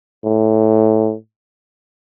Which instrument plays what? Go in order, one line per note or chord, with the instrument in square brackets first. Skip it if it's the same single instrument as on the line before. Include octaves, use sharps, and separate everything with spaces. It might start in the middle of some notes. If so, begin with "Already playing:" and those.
[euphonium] A2